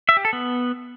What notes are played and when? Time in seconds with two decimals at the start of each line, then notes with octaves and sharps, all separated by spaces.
0.09 E5
0.17 G4
0.25 A4
0.33 B3